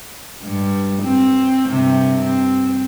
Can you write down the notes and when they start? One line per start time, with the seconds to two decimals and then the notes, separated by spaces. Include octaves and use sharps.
0.44 G2
1.02 C4
1.69 G2 C3
2.23 C4